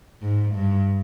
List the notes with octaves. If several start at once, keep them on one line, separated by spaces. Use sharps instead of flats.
G#2
G2